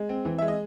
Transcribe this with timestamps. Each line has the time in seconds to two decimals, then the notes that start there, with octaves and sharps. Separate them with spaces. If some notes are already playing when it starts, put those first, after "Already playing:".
Already playing: G#3
0.09 C4
0.25 E3
0.38 G#3 E5
0.48 D#5